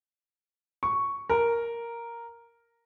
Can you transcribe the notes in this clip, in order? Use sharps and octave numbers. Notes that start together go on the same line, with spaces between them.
C#6
A#4